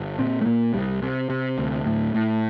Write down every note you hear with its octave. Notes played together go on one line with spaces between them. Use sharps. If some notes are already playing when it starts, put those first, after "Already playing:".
Already playing: G1
A#2 C4
A3
A#2 A#3
C2 G3
C3
C3
D2
A2
A2